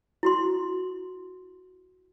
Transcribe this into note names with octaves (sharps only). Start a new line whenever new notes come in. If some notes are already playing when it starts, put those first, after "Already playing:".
E4 F#4 C6